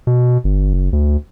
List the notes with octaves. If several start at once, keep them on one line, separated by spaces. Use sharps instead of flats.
B2
G1
F#1
D2